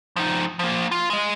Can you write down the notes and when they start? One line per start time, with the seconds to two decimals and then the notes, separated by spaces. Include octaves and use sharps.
0.16 F3 D#4
0.59 F3 A#3
0.91 F4
1.10 G#3 D#5